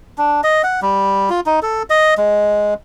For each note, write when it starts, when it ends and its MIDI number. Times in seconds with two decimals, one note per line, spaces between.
0.18 0.41 62
0.44 0.62 75
0.63 0.80 78
0.82 1.29 55
1.30 1.40 65
1.46 1.60 63
1.62 1.83 69
1.90 2.14 75
2.17 2.74 56